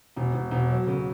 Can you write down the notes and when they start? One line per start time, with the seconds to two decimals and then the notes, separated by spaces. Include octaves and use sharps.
0.16 E1
0.34 E1
0.51 E1
0.70 F#3
0.87 C#3